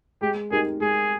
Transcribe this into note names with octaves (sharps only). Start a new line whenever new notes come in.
G#3 G4
D#4 G4 G#4 A#4
G#3 G#4